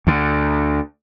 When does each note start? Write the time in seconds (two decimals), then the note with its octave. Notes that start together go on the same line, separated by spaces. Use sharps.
0.07 D2 D3